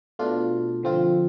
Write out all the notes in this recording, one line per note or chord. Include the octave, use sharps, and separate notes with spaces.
B2 A3 D4 F4
D3 F3 C4 F4